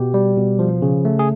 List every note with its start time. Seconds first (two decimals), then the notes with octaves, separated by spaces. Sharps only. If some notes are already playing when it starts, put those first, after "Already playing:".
Already playing: B2 G4
0.14 G3
0.37 B2
0.59 F3
0.82 C#3
1.05 A3
1.19 G#4